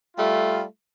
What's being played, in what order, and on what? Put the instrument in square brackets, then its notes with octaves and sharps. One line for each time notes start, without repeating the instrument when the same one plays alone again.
[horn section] G3 A3 F4